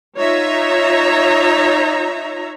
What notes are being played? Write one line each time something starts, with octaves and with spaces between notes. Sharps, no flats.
D#4 F4 C#5 E5 A#5